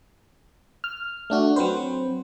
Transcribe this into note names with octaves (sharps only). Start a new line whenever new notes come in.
F6
A3 D4 F#4
F#3 C4 B4 C5